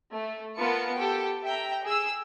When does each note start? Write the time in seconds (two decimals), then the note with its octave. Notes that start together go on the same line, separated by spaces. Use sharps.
0.12 A3
0.56 B3 F4 A#4 A5 C#7
0.95 G4 A4 G5
1.44 E5 G5 A#5
1.83 G#4 E6